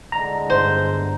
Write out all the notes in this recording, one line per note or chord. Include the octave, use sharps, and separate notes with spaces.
A2 D3 G#3 A#5
G1 C5